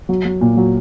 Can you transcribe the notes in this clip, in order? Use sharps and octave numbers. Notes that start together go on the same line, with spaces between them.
F#3
F#3
A#2
F#3